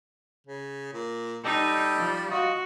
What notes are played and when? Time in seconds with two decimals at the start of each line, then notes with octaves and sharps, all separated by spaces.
0.47 C#3
0.93 A#2
1.45 G3 D#4 A4 D#5 G5
1.95 F3
2.31 F4 F#4 D#5 D#6